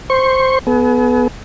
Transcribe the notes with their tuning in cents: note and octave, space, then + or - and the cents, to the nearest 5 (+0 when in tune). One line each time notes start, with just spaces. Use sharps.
C5 +0 C#6 -20
B3 +0 G#4 +45